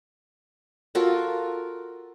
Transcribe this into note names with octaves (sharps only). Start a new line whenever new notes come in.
F4 F#4 A4 A#4